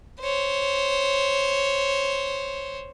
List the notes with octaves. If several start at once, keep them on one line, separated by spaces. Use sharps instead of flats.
C5 C#5